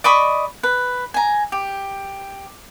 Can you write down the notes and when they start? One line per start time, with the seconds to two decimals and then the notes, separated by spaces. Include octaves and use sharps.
0.04 D5 D#5 B5 C#6
0.63 B4
1.14 G#5 A#5
1.52 G4